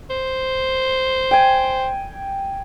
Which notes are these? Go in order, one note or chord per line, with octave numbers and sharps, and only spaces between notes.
C5
G5 G#5